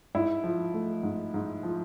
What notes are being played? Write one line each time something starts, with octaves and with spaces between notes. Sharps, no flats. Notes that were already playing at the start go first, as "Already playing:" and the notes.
G#2 E4
F3
A3
G#2
G#2
F3